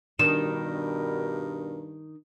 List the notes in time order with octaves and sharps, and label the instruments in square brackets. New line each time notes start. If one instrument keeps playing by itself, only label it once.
[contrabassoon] G2 [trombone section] B2 G3 A#4 [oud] D#3 D4 [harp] E7